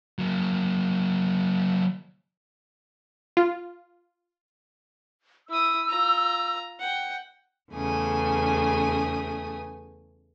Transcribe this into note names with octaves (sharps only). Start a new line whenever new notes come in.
F#3 A#3
F4
E4 D#6 E6
F4 A#5
F#5 G5
E2 C#3 A3 G#5 D#6